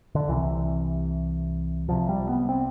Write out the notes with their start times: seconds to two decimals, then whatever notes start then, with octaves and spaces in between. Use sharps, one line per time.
0.15 D3
0.28 C2 C3 E3
1.89 C2 C3 F3
2.09 G3
2.29 B3
2.49 C4